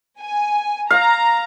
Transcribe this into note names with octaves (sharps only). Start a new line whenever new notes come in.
G#5
F5 A#5